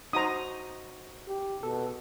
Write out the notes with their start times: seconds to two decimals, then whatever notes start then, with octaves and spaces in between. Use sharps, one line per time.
0.13 D#4 F#4 C5 A#5 D#6
1.28 G4
1.63 B2 A4